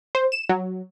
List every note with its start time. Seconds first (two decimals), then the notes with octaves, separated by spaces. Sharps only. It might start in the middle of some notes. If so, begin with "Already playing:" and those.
0.15 C5
0.32 E7
0.49 F#3